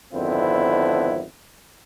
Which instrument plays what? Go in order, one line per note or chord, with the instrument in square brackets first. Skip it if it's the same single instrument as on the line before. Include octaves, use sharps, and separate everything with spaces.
[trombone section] G#1 F2 D3 B3 C4 E4